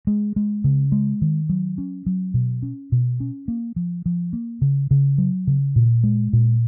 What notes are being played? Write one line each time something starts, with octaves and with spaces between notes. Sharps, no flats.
G#3
G#3
C#3
G#3
D#3
F#3
C#4
F#3
B2
C#4
B2
C#4
A#3
F3
F3
A#3
C#3
C#3
F#3
C#3
A#2
G#3
A#2